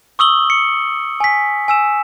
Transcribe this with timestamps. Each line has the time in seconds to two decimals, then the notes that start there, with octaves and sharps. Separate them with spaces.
0.19 C#6 D#6 E6 F#7 G7
0.50 C#7
1.20 G#5 B6
1.68 G#5 E6 E7